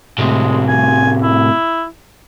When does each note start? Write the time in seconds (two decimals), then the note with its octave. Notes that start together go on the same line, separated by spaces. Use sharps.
0.18 A2 C3 G#3
0.68 G#5
1.23 E4